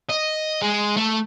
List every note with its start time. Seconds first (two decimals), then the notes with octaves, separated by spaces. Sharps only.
0.10 D#5
0.62 G#3
0.97 A3